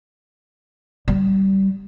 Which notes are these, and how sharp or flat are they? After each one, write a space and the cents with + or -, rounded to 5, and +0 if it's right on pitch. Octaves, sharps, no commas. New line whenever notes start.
G3 -20